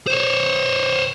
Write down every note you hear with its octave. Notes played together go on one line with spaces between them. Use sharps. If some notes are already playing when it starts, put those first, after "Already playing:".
C5 C#5